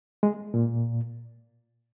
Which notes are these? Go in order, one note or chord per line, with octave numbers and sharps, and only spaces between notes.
G#3
A#2